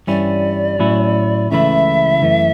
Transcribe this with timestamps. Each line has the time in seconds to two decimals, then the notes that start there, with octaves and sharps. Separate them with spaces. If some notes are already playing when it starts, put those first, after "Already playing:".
0.07 G2 E3 G3 C#4 E4 D5
0.79 A2 F#3 C#4 E4
1.50 C#2 C#3 E3 A3 E4 E5
2.22 F#2 E3 A3